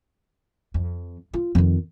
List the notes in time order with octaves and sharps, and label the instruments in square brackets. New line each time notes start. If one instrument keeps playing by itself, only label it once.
[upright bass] F2
F4
F2 D#3